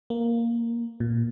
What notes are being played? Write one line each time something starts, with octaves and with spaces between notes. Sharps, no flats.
A#3
A#2